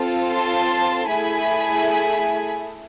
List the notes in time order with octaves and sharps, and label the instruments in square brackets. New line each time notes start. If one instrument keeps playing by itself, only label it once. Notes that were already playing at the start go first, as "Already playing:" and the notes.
Already playing: [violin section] C4 F4 A4
A5 C6
A3 E4 G#4 G#5 B5